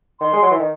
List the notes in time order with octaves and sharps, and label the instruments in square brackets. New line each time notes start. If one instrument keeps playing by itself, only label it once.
[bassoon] D#3 [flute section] C6
[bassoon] G#3
F#3
E3
D#3